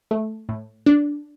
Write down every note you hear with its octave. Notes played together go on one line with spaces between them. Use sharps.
A3
A2
D4